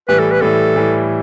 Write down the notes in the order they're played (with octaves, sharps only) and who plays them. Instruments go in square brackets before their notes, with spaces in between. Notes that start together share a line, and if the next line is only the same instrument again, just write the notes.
[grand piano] A2 E3 G3 [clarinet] B4
[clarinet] A4
B4
[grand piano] A2 E3 G3 [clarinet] A4
[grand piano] A2 E3 G3